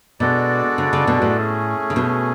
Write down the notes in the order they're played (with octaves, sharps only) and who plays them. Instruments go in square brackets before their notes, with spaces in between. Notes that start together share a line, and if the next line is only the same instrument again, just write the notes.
[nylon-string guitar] B2 [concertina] G#3 D4 F#4 A4 D5
[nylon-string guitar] C#3
C#3
B2
A2
[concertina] A3 C#4 G#4
[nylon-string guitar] C#3
B2